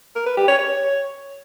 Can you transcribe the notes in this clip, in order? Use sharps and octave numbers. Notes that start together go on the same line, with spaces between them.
A#4
B4
G4
C#5
C#5